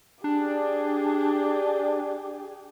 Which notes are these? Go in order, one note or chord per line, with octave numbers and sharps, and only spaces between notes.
D4 G4 G#4